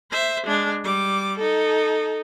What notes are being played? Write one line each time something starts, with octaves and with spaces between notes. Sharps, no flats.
C5 E5
G#3 D4
G3 D6
D#4 A4